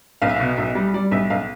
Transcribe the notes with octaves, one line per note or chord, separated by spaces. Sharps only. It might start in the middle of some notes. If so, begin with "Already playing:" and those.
B1 F5
E5
F5
B2
B1 E5
G3
G3 D5
B1 E5
B1 F5